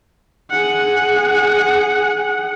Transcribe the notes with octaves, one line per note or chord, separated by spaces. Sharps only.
G#4 F#5